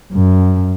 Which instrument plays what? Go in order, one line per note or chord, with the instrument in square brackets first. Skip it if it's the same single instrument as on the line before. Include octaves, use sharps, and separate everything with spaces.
[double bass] F#2